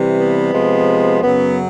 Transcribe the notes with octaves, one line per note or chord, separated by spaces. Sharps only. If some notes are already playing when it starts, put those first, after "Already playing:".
Already playing: C3 E3 G3
B3
C3 F3 G#3
F#2 C#3 F#3 B3